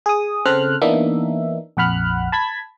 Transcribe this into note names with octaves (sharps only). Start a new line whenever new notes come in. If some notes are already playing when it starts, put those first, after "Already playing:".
G#4 D#6
C#3 C4 A4 C5 F6 F#6
E3 A#3 B3 D4 D#4 E5
A#1 F2 F#5 B5 F6 F#6
A5 B5 G#6 B6